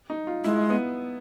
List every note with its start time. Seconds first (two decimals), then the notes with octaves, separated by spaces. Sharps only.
0.10 D#4
0.27 F4
0.44 G#3 E4
0.70 B3